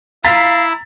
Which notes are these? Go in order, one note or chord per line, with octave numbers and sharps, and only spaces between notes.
E4 F5 A#5 A6 B6